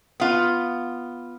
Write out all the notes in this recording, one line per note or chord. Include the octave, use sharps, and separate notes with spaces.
B3 F4